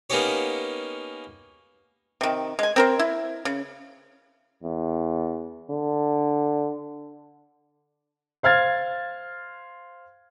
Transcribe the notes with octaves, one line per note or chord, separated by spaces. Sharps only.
A#3 B3 C#4 D#4 G4 C#5
C3 D#3
G#3 G#5
C4 A#4 C5
E4
C#3
E2
D3
C5 F5 F6 G#6 A6